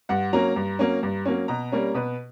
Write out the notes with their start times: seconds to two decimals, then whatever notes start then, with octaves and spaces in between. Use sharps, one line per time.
0.09 G2 F#5
0.33 F#3 A#3 C#4 A#5
0.56 G2
0.79 F#3 A#3 C#4
1.03 G2
1.25 F#3 A#3 C#4
1.48 B2 A#5
1.72 G3 A#3 C#4
1.94 B2 B4